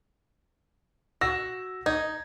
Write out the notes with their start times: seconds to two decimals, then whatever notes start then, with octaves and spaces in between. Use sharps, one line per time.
1.21 F#4 E6 A#6 E7
1.86 D#4 G#6